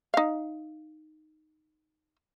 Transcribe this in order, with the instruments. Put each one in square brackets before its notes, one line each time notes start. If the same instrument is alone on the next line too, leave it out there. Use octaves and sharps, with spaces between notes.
[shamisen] D#4 F5